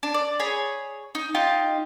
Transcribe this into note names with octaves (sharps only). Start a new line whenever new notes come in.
D4
D5
G#4 C#5 B5
D#4
D#4 F4 G4